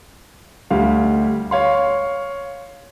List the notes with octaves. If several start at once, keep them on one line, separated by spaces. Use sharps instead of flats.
D2 G3 F5
C#5 F5 C6